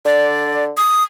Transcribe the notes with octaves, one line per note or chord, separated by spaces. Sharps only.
D3 D5
D#6